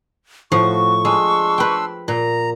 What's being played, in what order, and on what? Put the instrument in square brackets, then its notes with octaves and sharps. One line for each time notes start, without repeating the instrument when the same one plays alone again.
[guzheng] A2 F3 [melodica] F#4 [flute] C#6
[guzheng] G#3 [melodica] D4 C6 E6
[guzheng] B4 G5
[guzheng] A#2 [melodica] A#5